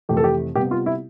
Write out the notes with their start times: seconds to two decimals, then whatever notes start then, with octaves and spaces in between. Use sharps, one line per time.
0.09 F2 C3 E3 A3 G4
0.17 A4
0.24 G4
0.55 C3 G3 B3 G4
0.71 F4
0.86 E4